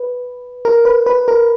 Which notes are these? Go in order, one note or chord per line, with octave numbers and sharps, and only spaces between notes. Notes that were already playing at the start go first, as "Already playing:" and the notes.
Already playing: B4
A#4
B4
B4
A#4